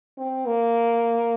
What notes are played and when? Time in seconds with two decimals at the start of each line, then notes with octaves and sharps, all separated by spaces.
0.18 C4
0.46 A#3